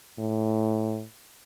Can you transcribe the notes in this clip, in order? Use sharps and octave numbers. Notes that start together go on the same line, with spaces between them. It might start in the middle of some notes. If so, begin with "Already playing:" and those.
A2